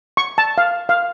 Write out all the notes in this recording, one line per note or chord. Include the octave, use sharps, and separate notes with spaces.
C#6
A5
F5
F5